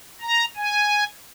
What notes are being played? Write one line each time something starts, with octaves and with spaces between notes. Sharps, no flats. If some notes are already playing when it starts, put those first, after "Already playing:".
A#5
G#5